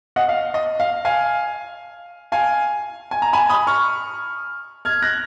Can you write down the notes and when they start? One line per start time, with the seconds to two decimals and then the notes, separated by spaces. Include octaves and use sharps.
0.16 D#5 F#5
0.29 F5
0.54 D#5
0.80 F5
1.05 F5 G#5
2.32 F5 G#5
3.11 G#5
3.22 A#5
3.33 G#5 B5
3.50 B5 D#6
3.67 C#6 F6
4.85 F6 G#6
5.02 F#6 A#6